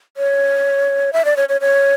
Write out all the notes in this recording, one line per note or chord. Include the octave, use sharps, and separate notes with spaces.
C#5
E5
D5
C#5
C#5
C#5